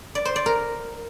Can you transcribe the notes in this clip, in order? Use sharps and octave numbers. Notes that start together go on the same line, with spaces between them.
D5
C5
D5
A#4